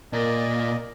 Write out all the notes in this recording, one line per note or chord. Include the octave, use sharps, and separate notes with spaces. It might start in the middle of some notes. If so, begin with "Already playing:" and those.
A#2 A#4 D5 D#5